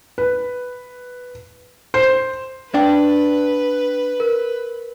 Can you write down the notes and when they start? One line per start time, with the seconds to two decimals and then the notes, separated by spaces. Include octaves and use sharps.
0.18 B4
1.94 C5
2.74 D4 B4 G5
4.20 A#4